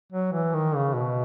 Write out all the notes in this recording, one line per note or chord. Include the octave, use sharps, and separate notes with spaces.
F#3
E3
D#3
C#3
B2